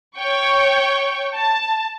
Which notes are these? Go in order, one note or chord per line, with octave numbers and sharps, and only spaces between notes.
C#5 G5 C#6
A5